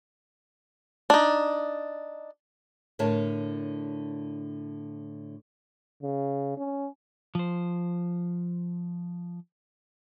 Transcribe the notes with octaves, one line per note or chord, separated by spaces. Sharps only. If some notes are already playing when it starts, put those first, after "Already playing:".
D4 D#4
A2 D3 A#4 C#5 A5
C#3
C#4
F3 C5